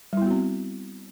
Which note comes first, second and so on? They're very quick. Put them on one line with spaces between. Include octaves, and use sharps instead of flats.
G3 E4 B3 F#4 C4